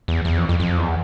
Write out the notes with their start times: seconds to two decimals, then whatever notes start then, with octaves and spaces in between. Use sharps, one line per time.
0.08 E2
0.25 E2
0.37 F2
0.49 F2
0.60 F2
0.77 E2